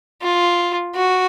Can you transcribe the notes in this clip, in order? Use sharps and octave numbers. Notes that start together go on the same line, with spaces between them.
F4
F#4